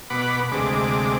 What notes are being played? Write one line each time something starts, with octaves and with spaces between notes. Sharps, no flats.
B2 F#5 B5 D6
D2 C3 G#3 D6